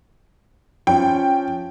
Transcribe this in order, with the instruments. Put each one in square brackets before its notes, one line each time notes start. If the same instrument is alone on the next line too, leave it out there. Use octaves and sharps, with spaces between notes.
[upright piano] F3 C#4 [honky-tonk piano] G5